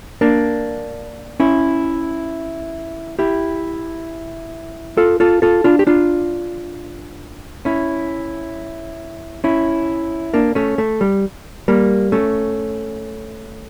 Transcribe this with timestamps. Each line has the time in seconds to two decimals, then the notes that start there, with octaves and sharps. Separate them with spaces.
0.21 A#3 D4
1.40 C#4 E4
3.19 E4 G4
4.97 F4 A4
5.20 F4 A4
5.42 F4 A4
5.64 D4 F4
5.79 G4
5.87 D4 F4
7.65 C#4 E4
9.44 C#4 E4
10.34 A#3 D4
10.55 A3 C#4
10.78 A3
11.01 G3
11.68 G3 A#3
12.12 A3 C#4